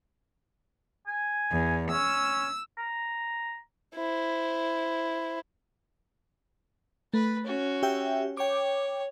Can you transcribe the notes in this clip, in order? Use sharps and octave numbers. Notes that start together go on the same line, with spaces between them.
G#5
E2
C#4 E6
A#5
E4 C5
A3 B4
C#4 F#4
G4 E5 G5
C#5 G5 D6